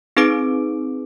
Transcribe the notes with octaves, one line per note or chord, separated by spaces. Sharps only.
C4 D#4 G#4 B4 D6 D7